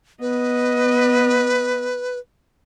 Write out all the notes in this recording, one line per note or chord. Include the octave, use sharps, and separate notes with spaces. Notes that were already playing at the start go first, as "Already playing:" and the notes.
B3 B4 D#5